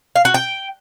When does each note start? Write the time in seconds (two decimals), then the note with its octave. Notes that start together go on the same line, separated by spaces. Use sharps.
0.16 F5
0.25 F#4
0.34 G5